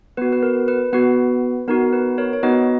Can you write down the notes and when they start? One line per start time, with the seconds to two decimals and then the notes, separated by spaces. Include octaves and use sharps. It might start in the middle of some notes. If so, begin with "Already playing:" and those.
0.17 B3 F#4 B4
0.33 B4
0.43 A#4
0.68 B4
0.93 B3 F#4 B4
1.68 B3 D#4 F#4 A#4
1.93 B4
2.18 A#4 C#5
2.33 C#5
2.43 B3 D#4 F#4 B4 D#5